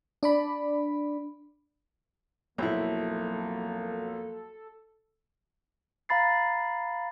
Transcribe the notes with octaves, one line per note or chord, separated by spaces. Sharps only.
D4 D5 B5
B1 F2 F#3 A#3 C4 E4 A4
F5 A#5 B5 A6 C7